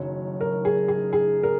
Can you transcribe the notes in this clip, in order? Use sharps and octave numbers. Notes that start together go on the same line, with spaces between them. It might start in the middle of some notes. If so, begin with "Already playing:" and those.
Already playing: F#1 F#2 D#3 F#3 C#5
A#4
G#4
G#4
G#4
A#4